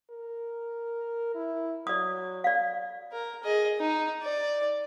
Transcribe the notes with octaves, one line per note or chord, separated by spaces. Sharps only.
A#4
E4
F#3 D5 D#6
D5 F5
A#4
G#4 D#5
D#4
D5